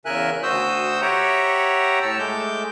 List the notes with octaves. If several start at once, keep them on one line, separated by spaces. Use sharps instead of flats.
E2 C#3 A#4 E5 G#5 F#6
D2 F#4 C5 D#6 E6 G6
G4 C#5 E5 F#5 G5 A#5
A2 A5 E6
G#3 A3 D6 G6